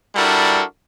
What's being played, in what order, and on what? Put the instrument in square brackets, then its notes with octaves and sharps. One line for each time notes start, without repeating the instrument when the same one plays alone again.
[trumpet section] G3 D4 E4 F#4 A4 A#4